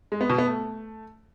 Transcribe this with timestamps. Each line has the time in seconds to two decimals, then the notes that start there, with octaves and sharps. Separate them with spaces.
0.12 G#3
0.21 B3
0.29 B2
0.38 B3
0.47 A3